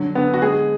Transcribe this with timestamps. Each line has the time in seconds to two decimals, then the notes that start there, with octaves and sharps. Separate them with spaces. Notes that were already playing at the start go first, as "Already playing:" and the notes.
Already playing: D3 F#3
0.15 D3 B3
0.34 F#4
0.42 G#3 G#4